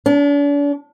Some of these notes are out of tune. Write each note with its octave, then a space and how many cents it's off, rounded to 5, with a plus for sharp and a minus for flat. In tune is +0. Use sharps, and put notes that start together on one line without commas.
D4 -45